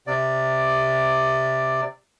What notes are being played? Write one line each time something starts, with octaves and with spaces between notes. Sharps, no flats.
C3 D5